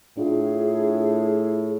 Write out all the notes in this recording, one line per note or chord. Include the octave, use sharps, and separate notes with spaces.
A2 D4 F4 G#4